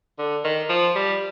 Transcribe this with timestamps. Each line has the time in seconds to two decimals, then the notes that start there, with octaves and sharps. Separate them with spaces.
0.18 D3
0.44 D#3
0.69 F3
0.95 G3